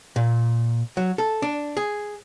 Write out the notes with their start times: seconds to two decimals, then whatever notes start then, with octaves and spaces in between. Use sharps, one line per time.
0.16 A#2
0.97 F#3
1.18 A4
1.42 D4
1.77 G#4